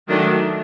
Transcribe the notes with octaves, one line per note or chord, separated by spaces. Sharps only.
D#3 F#3 A3 D4